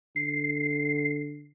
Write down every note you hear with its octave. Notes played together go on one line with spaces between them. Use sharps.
D3 C7